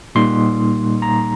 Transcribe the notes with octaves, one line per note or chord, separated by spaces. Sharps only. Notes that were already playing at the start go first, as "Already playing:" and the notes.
A#2 G3 A#3 D#4 C6
A#5